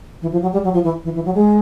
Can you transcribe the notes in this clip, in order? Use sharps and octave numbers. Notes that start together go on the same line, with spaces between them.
E3
F3
F#3
G3
F#3
F3
E3
E3
E3
F#3
G#3